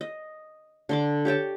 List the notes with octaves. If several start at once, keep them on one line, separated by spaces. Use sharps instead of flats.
D#5
D3 C6 D6
G4 C#5 G5 A5